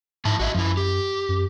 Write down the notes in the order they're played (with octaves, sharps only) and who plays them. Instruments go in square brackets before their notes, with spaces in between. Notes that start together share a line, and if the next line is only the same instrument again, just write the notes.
[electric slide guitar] F2 E4 A5 [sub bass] G#2
[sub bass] A1 [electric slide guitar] F#4 D#5 E5
[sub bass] F#2 [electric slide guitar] F3 E4
[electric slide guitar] G4
[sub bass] F#2